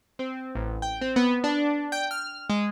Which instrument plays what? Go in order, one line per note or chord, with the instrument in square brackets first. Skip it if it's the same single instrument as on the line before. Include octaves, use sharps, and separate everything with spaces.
[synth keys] C4
A1
G5
C4
B3
D4
G5
F6
G#3